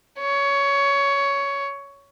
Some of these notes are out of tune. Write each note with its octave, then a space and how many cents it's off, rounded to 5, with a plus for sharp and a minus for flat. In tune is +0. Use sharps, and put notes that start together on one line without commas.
C#5 +15